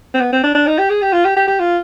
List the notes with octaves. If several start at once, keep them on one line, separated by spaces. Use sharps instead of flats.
C4
B3
C4
D4
D4
D#4
G4
G#4
G4
F4
G4
G4
G4
F4